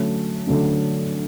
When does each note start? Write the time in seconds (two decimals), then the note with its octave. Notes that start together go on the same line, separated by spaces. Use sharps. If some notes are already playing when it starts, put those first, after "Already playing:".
Already playing: D3 F#3 A3 C#4
0.47 D3 F#3 A3 C#4